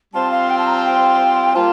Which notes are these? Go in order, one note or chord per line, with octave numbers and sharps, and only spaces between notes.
G3 C4 F4 C5 A5
F5
G5
A5
A#5
A5
G5
G3 A#3 F4 A5